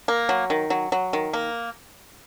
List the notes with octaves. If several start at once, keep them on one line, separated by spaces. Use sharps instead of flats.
A#3
F#3
D#3
F#3
F#3
D#3
A#3